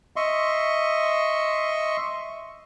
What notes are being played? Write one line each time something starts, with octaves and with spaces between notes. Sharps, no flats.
D#5 E5 C6 C#6